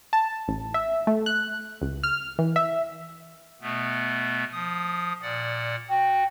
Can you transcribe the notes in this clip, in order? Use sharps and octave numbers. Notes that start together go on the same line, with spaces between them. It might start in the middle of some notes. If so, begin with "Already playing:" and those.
A5
A1
E5
A3
F#6
C#2
F6
E3
E5
B2 A3 B3
F3 D#6
A#2 D5 F#5
F#4 G5